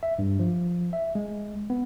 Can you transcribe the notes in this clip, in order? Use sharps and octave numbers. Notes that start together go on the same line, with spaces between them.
E5
G2
F3
E5
G#3
B3